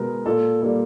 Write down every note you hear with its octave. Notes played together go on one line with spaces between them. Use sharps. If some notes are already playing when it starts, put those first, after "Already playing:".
Already playing: B2 G#3 A#4 B4
A#2 A4
G3 A#3 A4